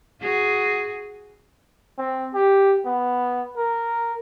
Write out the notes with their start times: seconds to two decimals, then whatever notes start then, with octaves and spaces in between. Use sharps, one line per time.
0.21 F#4 G#4
1.99 C4
2.34 G4
2.86 B3
3.57 A#4